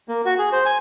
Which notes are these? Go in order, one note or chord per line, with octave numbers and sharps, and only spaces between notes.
A#3
F#4
G#4
C5
G#5